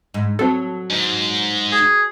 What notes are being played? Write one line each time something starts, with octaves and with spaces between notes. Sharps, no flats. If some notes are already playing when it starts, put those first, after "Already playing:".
G#2
F#3 C4 A4
G#2
G#4